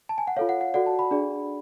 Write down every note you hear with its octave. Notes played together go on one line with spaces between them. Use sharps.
A5
G#5
F#5
F4 A4 C#5 F5
F#5
F#5
F#4 A4 D5 F#5
A5
B5
D4 G#4 D5